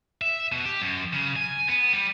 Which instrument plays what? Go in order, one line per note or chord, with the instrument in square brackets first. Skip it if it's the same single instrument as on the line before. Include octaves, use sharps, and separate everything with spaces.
[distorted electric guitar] E5
B2
G4
F#2
C#3
G#5
B3
G3